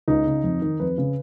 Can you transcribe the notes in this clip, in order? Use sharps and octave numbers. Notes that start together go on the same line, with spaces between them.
C#2 D#4
C#3
F2
D#3
F2 B4
C#3